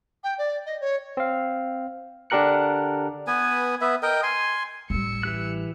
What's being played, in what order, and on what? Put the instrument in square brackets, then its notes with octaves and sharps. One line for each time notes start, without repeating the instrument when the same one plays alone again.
[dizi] G5
D5
D#5
C#5
[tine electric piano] C4 F5
D3 D4 G4 A#4 F#6 C#7
[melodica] B3 B4 G#5
B3 B4 E5
A#4 D#5 G5
G#5 C6
[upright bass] A1 G3 [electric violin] E6 C#7
[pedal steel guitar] E3 G4 F#6